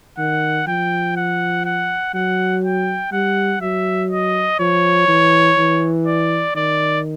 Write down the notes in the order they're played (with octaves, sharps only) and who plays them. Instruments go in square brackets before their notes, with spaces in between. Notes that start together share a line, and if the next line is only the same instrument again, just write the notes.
[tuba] D#3 [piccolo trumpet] F#5
[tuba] F3 [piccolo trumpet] G5
[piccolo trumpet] F#5
F#5
[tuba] F#3 [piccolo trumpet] F#5
[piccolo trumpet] G5
[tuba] G3 [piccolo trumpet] F#5
[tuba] F#3 [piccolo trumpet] E5
[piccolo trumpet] D#5
[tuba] F3 [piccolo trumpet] C#5
[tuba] E3
E3
[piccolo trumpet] D5
[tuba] D#3 [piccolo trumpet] D5